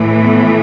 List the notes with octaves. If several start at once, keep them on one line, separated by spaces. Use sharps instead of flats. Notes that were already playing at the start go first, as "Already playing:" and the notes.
Already playing: A2 E3 A3
B3